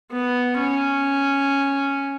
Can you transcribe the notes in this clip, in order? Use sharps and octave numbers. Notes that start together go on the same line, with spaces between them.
B3
C#4